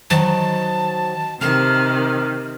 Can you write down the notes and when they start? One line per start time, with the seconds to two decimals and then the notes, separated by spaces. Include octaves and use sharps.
0.10 D#3 F#3 C5 A5
1.41 C3 D#3 A5 F6